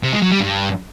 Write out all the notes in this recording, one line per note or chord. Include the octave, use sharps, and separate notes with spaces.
C3
G#3
F#3
G3
G2